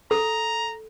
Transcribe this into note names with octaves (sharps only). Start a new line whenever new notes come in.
A4 A#5